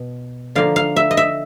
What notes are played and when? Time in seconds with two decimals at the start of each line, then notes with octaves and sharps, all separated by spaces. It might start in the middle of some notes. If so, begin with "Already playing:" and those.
Already playing: B2
0.55 D3 F3 A#3 F5
0.76 F5
0.96 E5
1.11 D#5
1.17 E5